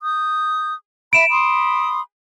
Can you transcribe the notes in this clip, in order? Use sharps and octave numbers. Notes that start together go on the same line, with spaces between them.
D#6 G6
E5 B5 D7 E7
B5 C6 D#6